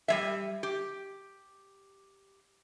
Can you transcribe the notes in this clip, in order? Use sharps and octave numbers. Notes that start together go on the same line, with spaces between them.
G3 G#3 E5
G4